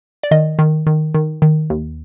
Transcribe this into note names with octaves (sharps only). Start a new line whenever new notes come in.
D5
D#3 D#5
D#3
D#3
D#3
D#3
D#2